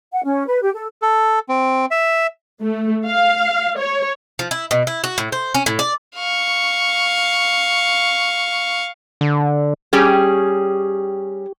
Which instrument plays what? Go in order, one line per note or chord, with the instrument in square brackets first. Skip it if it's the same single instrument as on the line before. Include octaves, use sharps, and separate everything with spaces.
[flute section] F#5
C#4
B4
G4
A4
[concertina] A4
C4
E5
[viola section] A3
F5
C#5
[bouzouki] F3
E4
B2
E4
F#4
A2
C5
C#4
A2
D5
[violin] F5 C#6
[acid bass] D3
[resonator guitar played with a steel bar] G3 C#4 G#4 [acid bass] G4